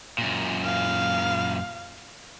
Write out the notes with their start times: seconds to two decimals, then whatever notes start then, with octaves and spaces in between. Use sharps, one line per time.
0.18 F#2 A#2
0.64 F5